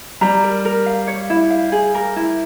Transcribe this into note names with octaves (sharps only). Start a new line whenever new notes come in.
G3 A#5
A#4
A#4
F5
C#5
E4
F5
G#4
A#4
E4